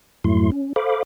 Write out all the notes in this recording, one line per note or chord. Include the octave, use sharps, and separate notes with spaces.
F2 G#2 F#3 A3 E4 C6
C#4
A4 C5 F5 B5 D6